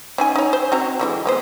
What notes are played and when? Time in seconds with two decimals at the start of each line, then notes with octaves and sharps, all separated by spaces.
0.18 C#4 D#4 G#5
0.36 D#4 C#5
0.53 C5
0.72 C4 F#4 A#5
0.99 D3 E3 G#3
1.26 G#3 B3 C5